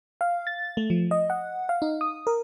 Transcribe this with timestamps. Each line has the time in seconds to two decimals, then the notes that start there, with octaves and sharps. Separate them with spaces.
0.21 F5
0.47 A6
0.77 A3
0.90 F3
1.11 D#5
1.30 F#5
1.69 F5
1.82 D#4
2.01 D#6
2.27 A#4